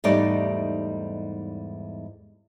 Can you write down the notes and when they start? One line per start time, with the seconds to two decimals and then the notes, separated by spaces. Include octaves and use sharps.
0.04 E2 G#2 G3 A3 D#4 D5